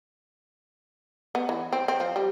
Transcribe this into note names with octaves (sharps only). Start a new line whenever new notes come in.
B3
E3
C4
C4
F3
G3